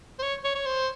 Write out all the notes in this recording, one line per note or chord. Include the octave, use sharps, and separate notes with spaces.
C5
C#5
C#5
C#5
C5